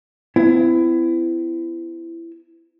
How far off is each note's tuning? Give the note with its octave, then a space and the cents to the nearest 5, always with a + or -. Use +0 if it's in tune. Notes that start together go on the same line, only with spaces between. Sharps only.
C4 -45 E4 +20